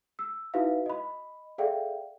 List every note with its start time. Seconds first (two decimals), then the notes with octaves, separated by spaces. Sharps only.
0.19 E6
0.54 D#4 E4 F#4 B4 E5 F5
0.86 D#5 B5
1.58 G#4 A4 D5 E5 F5 G5